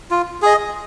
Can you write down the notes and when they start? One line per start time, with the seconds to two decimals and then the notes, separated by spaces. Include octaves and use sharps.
0.11 F4
0.42 G#4 D#5